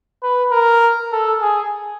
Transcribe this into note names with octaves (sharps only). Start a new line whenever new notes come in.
B4
A#4
A4
G#4